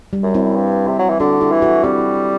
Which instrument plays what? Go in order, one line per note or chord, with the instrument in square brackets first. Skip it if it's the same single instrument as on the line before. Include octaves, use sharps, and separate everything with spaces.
[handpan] G3
[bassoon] F#2
[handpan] C4 E4
[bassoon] G2
C3
F#3
E3
[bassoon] D3 [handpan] D4 F#4
[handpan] E4 G4
[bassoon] E3
[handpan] F#4 A4
[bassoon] G3 [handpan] C4 E4